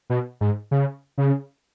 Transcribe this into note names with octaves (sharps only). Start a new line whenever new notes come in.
B2
G#2
C#3
C#3